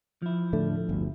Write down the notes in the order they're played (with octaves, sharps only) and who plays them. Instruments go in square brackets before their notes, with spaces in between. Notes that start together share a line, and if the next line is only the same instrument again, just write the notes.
[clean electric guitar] F3 E4
[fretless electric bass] A2 D3 A3
G1 D2